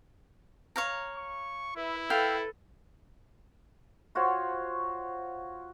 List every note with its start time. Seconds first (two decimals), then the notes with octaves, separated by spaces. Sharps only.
0.76 C#5 F5 A#5
1.17 C#6
1.76 E4 B4 E5
2.10 A4 B4 F5 G5 B5
4.15 F4 F#4 C5 C#5